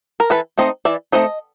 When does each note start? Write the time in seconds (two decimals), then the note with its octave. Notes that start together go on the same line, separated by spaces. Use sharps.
0.20 A#4
0.30 E3 A4 B4
0.58 A3 C4 D#4 D#5
0.85 E3 D5 E5
1.12 A3 C4 D#4 D#5